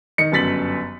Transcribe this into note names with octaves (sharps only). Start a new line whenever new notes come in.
D#3 D#5 C#7
G1 F#2 A6 B6 F#7